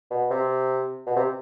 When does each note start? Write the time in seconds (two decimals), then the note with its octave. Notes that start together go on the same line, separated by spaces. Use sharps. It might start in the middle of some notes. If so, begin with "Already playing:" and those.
0.11 B2
0.31 C3
1.07 B2
1.16 C3